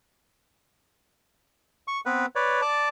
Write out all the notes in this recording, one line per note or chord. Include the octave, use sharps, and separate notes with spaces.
C#6
B3 C4 B4
B4 C#5 D5
D5 A5 D6